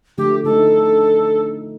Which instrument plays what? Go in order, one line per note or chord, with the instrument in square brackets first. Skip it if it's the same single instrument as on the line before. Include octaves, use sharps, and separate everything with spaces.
[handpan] D3 F3 A3 [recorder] G4
[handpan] D3 A3 D#4 [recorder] A4